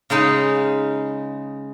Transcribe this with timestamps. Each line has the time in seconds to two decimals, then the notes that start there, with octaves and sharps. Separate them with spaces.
0.10 C#3 G#3 D#4 B5